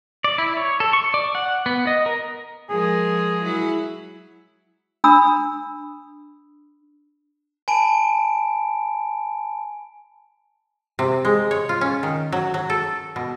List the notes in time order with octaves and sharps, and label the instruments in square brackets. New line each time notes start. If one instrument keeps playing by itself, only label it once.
[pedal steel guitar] D5
E4
C#5
A4
C#6
D5
F#5
B3
D#5
A#4
[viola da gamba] F3 G#3 A#4 [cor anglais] G#4
[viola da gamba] F#3 E4
[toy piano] D4 A#5 B5 D#6 E6
[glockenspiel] G#5 A5 B5 D7
[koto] C3
G#3
C#5
F4
C#4
D#3
F#3
F#3
A4
B2